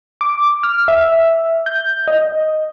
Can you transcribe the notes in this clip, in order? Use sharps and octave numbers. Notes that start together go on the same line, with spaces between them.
D6
F6
E5
G6
D#5